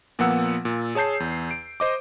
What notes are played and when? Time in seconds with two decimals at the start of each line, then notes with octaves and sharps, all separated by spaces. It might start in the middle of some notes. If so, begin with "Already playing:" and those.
0.19 A#2 F3 A#3 B3 F#5 E6
0.65 A#2
0.95 G#4 C#5 A5 G6 C7
1.20 E2
1.51 D7
1.80 C5 D#5 D6